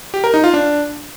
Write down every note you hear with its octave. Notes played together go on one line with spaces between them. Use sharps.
G4
A#4
D#4
F4
D4